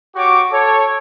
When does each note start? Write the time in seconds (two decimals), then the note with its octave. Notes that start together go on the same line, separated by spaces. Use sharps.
0.15 F#4 G4 C#5 C#6 D6
0.51 A4 C#5